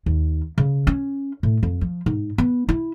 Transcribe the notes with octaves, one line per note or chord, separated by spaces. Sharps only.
D#2
C#3
C#4
A2
F2
F3
G#2
B3
E4